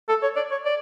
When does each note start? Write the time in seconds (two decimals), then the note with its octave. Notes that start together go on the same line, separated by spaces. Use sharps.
0.09 A4
0.22 C#5
0.36 D5
0.51 C#5
0.65 D5